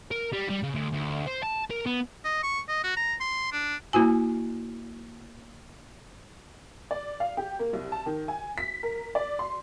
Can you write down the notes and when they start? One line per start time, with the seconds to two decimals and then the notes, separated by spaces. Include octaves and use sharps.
0.11 A#4
0.32 G3
0.49 G3
0.63 C#3
0.74 D2
0.93 D2
1.27 C5
1.43 A5
1.71 A#4
1.86 B3
2.25 D#5
2.43 C#6
2.69 D#5
2.84 F#4
2.96 A#5
3.20 C6
3.52 D4
3.93 A#3 E4 F#4 G#5
6.91 D5
7.20 F5
7.37 G4
7.59 A#3
7.73 C2
7.92 A5
8.06 D#3
8.28 G#5
8.58 B6
8.83 A#4
9.15 D5
9.39 C6